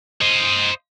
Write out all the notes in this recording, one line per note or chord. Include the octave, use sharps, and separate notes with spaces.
C5 D#5